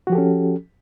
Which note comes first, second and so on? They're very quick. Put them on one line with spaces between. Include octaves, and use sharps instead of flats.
F#4 F3 G4 A4 C#4